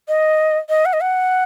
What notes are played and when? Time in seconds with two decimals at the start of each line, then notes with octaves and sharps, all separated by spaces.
0.08 D#5
0.69 D#5
0.85 F#5
0.93 D#5
1.01 F#5